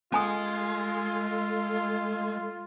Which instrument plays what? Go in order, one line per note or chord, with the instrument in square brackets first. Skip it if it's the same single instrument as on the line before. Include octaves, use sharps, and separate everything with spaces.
[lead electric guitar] G#3 [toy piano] C#4 G#5 D#6 [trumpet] F4 [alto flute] A4